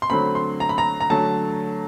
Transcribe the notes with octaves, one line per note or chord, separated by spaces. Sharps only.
C6
D3 F#3 A3 C4 B5
C6
A#5
B5
A#5
A#5
D3 F#3 A3 A5